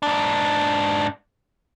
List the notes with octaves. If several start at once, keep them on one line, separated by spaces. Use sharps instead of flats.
G#2 D4